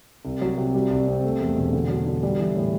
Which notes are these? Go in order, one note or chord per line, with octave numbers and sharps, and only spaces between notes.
C2
F#3
C3
G3
C2
C4
A3
E2
E1
D3
F#3
D3
G3
E3
A2